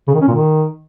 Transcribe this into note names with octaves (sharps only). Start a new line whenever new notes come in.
C#3
D#3
C#4
A#2
D#3